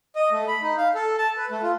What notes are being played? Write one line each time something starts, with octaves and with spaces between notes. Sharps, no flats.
D#5
A3
B5
D#4
F5
A4
A5
B4
A3
F4